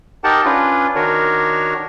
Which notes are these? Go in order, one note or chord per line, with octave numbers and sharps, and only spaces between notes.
D#4 G4 A#4 F#5 G5 A5
C#4 D4 F4 B4
D#3 D4 F#4 A#4 C#5